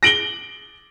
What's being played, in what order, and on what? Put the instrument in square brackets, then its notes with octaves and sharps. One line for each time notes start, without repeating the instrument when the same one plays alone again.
[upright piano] A#6 D7 F#7 G7